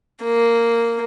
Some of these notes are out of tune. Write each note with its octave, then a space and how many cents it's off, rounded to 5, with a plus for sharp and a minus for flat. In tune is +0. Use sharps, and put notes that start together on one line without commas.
A#3 -5